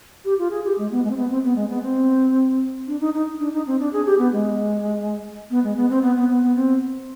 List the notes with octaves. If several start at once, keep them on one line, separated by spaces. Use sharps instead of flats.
G4
F4
G#4
G4
G#3
B3
G#3
C4
B3
C4
B3
G#3
B3
C4
D4
D#4
D#4
D4
D#4
C4
D4
G#4
G4
B3
G#3
B3
G#3
B3
C4
B3
B3
B3
B3
C4